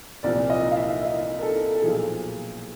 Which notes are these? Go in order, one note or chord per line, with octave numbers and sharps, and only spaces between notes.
C2 A#2 F3 D5
D#5
F5
E5
D#5
A#4
A4
A4
B1 A#2 F3 G#4